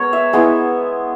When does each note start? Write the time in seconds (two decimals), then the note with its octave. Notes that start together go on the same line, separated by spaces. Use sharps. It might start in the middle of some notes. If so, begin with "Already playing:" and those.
Already playing: G#3 B3 A#4 C#5
0.13 E5
0.33 G#3 B3 E4